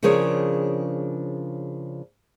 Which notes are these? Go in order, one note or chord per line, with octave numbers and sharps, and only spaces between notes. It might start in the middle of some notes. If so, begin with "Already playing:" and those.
C#3 F3 D4 G#4 A#4 C#5